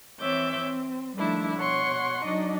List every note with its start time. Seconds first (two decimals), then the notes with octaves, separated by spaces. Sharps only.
0.20 E3 C4 C#5 E5 D6 G6
0.62 C4
1.17 D#3 F3 G3 A3 D4 E4
1.57 B2 C#5 F#5 C6 C#6
2.24 F#3 D4 D#4 D5 D#5